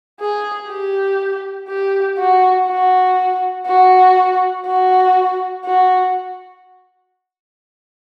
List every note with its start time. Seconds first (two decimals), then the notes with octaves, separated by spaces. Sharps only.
0.20 G#4
0.69 G4
1.68 G4
2.18 F#4
2.68 F#4
3.67 F#4
4.66 F#4
5.65 F#4